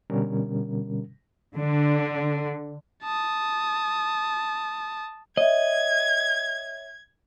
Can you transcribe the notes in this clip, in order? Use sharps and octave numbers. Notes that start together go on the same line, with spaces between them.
B2 D3 G3 C#4 A#4
D3
A5 D#6
C#5 D#5 E5 G#6